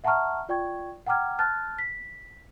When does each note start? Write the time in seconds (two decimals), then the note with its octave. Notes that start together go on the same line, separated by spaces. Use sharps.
0.04 E5 F#5 A5 A#5 C#6 F6
0.49 F4 D5 G5 C#6 G#6
1.07 F#5 G5 A#5 D6 F6 G#6
1.39 A5 F6 F#6 A6
1.78 B6